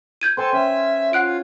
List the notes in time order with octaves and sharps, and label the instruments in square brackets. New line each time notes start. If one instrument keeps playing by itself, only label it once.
[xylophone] G6 G#6 D#7
[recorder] A4 [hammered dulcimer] C5 G5 G#5
[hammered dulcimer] C#4 G#5 [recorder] E5
[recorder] F4 [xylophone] F#5 F#6 D7